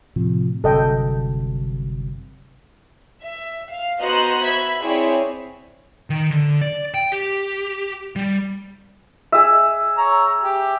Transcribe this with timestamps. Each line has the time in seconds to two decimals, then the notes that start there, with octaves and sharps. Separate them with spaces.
0.16 A2 C3 F3
0.64 G1 C3 F#3 A4 D#5 G5
3.24 E5
3.69 F5
4.01 B3 F#4 C5 D#5 A#5 F#6
4.43 E5 B5 G#6 B6
4.84 C4 E4 G#4 C#5 D5
6.10 D#3
6.31 D3
6.61 D5
6.94 G5
7.12 G4
8.16 G3
9.32 G#4 E5
9.98 C#5 A#5
10.44 G4